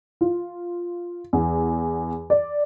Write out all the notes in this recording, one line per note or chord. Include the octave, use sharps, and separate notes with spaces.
F4
E2
D5